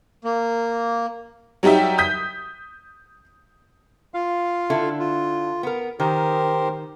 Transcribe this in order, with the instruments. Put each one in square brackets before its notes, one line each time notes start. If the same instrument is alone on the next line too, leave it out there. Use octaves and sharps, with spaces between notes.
[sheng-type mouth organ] A#3
[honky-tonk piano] F#3 G3 D#4 G4 E5
D#6 G6 B6
[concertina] F4 F5
[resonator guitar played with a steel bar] D3 E4 A4
[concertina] F4
[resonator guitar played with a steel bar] B3 A#4
[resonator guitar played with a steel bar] D#3 [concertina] G4 A#4 C5